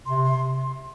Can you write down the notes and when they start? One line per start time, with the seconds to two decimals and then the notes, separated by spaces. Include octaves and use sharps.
0.06 C3 C6
0.24 C6